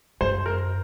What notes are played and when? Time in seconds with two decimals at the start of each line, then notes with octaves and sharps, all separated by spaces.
0.21 F#2 C5
0.46 A#4